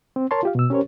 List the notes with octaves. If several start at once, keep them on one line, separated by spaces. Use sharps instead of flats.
C4
A#4 C#5 A5 C6
F4 G4 F5
B2 E6
C#4 G4 A#4 C5 C#5